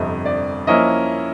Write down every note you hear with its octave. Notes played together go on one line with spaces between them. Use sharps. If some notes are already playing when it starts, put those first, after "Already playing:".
Already playing: G1 F2 C3 D#5
D5
F3 A#3 C#4 E4 D#5